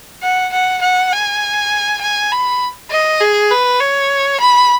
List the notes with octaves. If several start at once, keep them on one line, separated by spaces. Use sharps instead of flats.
F#5
F#5
F#5
G#5
G#5
B5
D#5
G#4
B4
C#5
B5